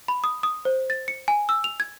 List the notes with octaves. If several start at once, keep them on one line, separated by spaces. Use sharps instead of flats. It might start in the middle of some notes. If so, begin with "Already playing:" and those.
B5
D#6
D#6
C5
A6
C#7
G#5
E6
F7
G#6